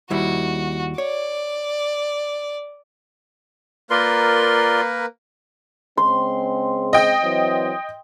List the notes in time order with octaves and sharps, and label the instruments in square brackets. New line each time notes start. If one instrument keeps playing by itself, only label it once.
[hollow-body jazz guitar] D#2 G3 E4 [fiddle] F#4
[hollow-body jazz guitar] C#5 [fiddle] D5
[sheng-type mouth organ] A#3 A#4 B4 [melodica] F4 D5 C6
[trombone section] C#3 G#3 C4 [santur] C6
[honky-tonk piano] D#5 G5
[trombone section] E3 F#3 C4